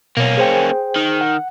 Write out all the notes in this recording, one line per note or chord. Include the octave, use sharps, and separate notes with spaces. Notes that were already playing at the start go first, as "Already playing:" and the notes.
B2 A#3 C#4
G#4 C5 G5
D#3
F#5